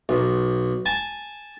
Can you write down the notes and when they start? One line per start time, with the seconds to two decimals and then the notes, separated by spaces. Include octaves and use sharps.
0.09 B1
0.86 G#5 A5